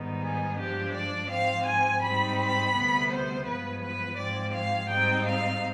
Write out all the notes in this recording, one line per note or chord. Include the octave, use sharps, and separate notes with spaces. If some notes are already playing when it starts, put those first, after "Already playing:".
Already playing: G#2 D#3 G3 B3 D#4
G#4
G2 F3 G#3 D4 G4
D5
G#2 F3 C4 F5
G#5
G#2 G3 C4 D#4 B5
B5
D2 C3 G3 B3
C5
G2 F3 G#3 B3 B4
B4
G#2 F3 G#3 C4 D5
F5
G#2 G3 C4 D#4 G5
F5